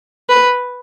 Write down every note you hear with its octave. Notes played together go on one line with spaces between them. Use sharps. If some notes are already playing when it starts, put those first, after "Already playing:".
B4